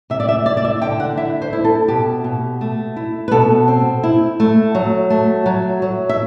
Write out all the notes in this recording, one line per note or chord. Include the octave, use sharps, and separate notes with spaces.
C3 E5
D5
E5
E4 D5
D5
E5
D3 G5
F#5
E4 E5
C5
E4
A4
B2 G4
B2
A3
E4
B4
B2 A4
C4
E4
A3
F#3
A3
F#3
F#3
E5